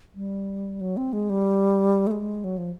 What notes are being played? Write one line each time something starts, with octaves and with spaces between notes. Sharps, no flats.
G3
F#3
C4
G#3
G3
A3
G#3
F#3
F3